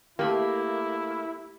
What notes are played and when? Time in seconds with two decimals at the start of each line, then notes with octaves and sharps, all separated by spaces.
0.19 A3 A#3 E4 G4 B5